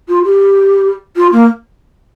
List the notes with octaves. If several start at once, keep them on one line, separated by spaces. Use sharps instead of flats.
F4
G4
F4
A#3